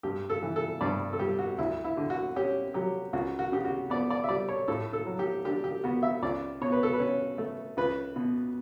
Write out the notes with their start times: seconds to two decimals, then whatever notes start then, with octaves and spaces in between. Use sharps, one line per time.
0.03 G2 G4
0.30 A4
0.43 E3
0.56 A4
0.81 G2 D5
1.13 A4
1.19 G3 G4
1.39 F#4
1.58 D2 E4
1.84 E4
1.97 D3
2.10 F#4
2.36 C#4 G4
2.74 F#3 G4
3.13 C#2 F#4
3.39 F#4
3.52 C#3 G4
3.65 F#4
3.90 B3 D5
4.10 D5
4.24 E5
4.29 G3 D5
4.49 C#5
4.68 A2 A4
4.93 A4
5.06 F#3
5.19 G4
5.45 D4 G4
5.64 G4
5.84 B3 F#4
6.03 E5
6.22 C#2 D5
6.61 B2 C#5
6.72 B4
6.83 A4
6.93 B4
7.00 C#4
7.38 A3
7.77 C#2 B4
8.16 B2